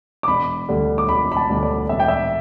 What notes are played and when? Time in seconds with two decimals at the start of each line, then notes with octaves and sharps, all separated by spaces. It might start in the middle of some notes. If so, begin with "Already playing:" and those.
0.23 D6
0.28 E1 B5
0.69 D2 D3 G3
0.98 D6
1.09 E1 B5
1.32 B5
1.36 A5
1.49 D2 D3 G3
1.63 D5
1.89 E1 E5
2.00 G5
2.08 E5